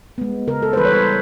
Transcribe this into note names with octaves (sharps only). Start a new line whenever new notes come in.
G#3 B3
C#3 A#4
A4
C5
E3 G3 B4
C#5
C5